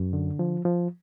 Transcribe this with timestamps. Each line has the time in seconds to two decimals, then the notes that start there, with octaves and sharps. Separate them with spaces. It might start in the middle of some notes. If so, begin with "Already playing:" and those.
Already playing: F#2
0.13 D3
0.39 F3
0.65 F3